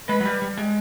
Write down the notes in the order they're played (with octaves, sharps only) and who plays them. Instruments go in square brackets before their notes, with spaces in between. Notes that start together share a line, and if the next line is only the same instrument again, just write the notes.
[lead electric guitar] G#3 [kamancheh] B4
[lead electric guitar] F#3
G3
G3
G#3